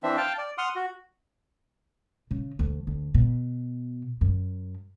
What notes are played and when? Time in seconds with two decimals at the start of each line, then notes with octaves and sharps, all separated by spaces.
0.03 E3 C4 D4 E5
0.17 F5 G5 A5
0.38 D5
0.58 F#5 C6 D#6 F6
0.76 F#4
2.31 C#3
2.59 D2
2.87 D2
3.14 B2
4.21 F#2